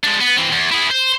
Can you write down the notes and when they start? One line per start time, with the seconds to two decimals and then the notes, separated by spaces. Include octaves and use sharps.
0.04 G#3 D4
0.21 B3
0.37 E3 C4
0.52 E2
0.71 E4 G#4
0.90 C5